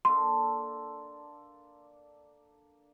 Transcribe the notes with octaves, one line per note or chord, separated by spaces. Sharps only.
A#3 D4 A4 C6